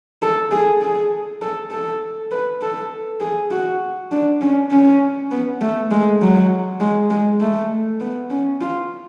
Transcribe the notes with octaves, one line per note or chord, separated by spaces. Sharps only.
A4
G#4
G#4
A4
A4
B4
A4
G#4
F#4
D4
C#4
C#4
B3
A3
G#3
F#3
G#3
G#3
A3
B3
C#4
F4